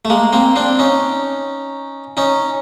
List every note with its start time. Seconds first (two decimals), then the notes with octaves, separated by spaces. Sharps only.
0.05 A3
0.10 G#3 A#3
0.33 A#3 C4
0.56 C4 D4
0.79 C#4 D#4
2.17 C#4 D#4